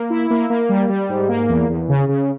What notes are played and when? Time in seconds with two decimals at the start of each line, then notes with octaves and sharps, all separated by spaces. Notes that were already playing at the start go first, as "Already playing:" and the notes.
Already playing: A#3
0.10 E4
0.30 A#3
0.50 A#3
0.69 G3
0.89 G3
1.09 G#2
1.29 A#3
1.49 E2
1.69 E2
1.89 C#3
2.09 C#3